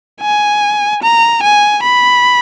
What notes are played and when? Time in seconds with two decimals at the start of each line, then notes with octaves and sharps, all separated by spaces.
0.21 G#5
1.03 A#5
1.43 G#5
1.83 B5